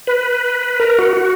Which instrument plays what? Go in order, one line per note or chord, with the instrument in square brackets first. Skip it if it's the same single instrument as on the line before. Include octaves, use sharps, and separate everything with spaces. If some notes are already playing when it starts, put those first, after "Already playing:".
[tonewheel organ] B4
A#4
F#4
F#4